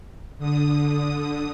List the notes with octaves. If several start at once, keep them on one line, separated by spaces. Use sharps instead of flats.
D3 D#6